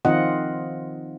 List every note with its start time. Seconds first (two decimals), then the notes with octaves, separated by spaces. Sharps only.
0.05 D#3 F3 C4 F4 D#5 F#5